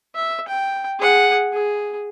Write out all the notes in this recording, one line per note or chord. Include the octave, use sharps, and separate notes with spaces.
E5
G5
G#4 F#5
G#4